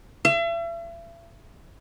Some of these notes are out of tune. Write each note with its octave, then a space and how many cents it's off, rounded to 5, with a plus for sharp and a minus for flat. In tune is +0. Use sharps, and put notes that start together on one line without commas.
E5 +40